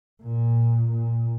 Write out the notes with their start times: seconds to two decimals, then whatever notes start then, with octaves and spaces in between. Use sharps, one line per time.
0.22 A#2
0.90 A#2